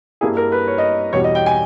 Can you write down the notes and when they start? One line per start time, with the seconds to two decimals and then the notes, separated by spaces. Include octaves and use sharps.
0.21 G2 G3 A#3 E4 G#4
0.37 A#4
0.52 B4
0.67 C#5
0.78 D#5
1.12 E2 B2 G3 C#5
1.24 D#5
1.35 G5
1.46 G#5